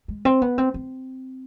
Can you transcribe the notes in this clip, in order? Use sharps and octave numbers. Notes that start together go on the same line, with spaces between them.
G#3
C4
B3
C4
C4